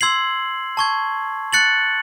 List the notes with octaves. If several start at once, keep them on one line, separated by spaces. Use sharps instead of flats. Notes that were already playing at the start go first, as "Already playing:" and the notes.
C6 E6 G#6 C7 F#7
A5 C#6 G#6
F#6 A6 C#7 F#7